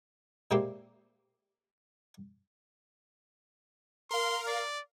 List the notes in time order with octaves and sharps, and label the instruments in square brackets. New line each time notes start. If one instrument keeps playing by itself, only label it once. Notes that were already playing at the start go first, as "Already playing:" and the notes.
[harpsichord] A#2 G#3 A#3 C4 E4 G4
[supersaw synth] A#4 F5 [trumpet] C6
[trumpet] D5